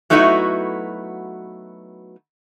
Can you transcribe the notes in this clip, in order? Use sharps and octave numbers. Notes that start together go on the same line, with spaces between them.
F#3 A3 B3 D#4 E4 F#4